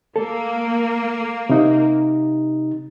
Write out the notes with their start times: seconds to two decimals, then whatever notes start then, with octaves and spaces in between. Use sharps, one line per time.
0.16 A#3 A4
1.49 C3 D#4